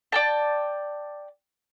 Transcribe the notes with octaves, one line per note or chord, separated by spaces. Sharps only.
D5 G5 A5